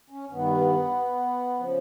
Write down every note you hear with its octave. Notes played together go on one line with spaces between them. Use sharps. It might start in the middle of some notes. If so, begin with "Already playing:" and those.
C#4
G2 D#3 B3
C#3 F3